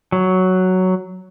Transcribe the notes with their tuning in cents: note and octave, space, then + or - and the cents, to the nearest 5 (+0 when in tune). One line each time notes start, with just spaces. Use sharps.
F#3 +5